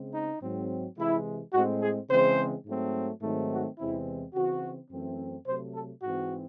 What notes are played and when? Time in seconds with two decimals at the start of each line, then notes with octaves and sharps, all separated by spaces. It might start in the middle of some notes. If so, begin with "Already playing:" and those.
Already playing: C#3 G#3 C4
0.14 D#4
0.42 G#2 F#3 C4
0.97 C3 E3 G#3 E4
1.53 A2 G#3 C4 F#4
1.82 G#4
2.10 C#3 E3 G#3 C4 C5
2.66 G#2 F#3 A3 C4
3.22 G#2 D#3 F#3 A3 C4
3.51 F#4
3.78 E2 C3 E3 G#3 C4 E4
4.34 C#3 E3 C4 F#4
4.91 F#2 E3 A3 C4
5.47 C3 F#3 A3 C5
5.75 A4
6.03 G#2 E3 C4 F#4